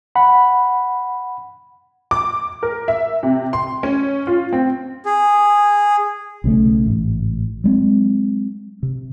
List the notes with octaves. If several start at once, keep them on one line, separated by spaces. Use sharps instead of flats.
F#5 B5
D6
A#4
E5
C3
C6
C#4
F4
C4
G#4
B1 C#3 F#3 A3
A1 G#2
F#3 G#3 C4
C3